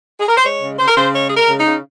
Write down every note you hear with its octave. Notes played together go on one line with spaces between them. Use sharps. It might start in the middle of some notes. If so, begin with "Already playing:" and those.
G#4
A#4
C5
G#3 C#5
C#3
C#3 C5
A#4
C#3 C5
G#3 C#5
G#3 G#4
A#4
C#3
D#4
C#3